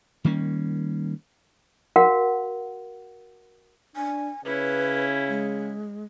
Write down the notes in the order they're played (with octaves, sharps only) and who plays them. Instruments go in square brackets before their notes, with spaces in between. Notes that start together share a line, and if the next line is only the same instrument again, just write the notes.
[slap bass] D#3 G3 A#3 C#4
[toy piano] F#4 A#4 F5 F#5
[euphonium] D4 [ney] G#5
[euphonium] C#3 [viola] C#4 E4 [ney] B4
[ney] G#3